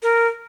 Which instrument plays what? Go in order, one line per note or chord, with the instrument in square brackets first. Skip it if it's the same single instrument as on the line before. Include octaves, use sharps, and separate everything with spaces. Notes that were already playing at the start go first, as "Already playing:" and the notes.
[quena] A#4